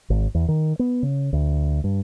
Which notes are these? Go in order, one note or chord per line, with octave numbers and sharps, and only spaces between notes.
G#1
E2
D#3
B3
C#3
D2
G2